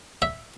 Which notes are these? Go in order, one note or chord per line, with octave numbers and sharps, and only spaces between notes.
E5